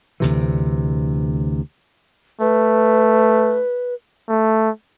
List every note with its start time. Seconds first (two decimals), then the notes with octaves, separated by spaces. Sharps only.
0.20 D2 C3 E3
2.41 A3 B4
4.29 A3